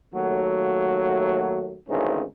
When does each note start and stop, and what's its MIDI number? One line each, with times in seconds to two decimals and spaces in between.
0.14 1.77 39
0.14 1.77 54
0.14 1.77 57
1.88 2.23 32
1.88 2.23 38
1.88 2.23 49
1.88 2.23 52
1.88 2.23 61
1.88 2.23 63